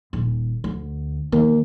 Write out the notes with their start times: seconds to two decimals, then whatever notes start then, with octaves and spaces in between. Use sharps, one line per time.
0.13 D#1
0.64 D2
1.32 D#3 A#3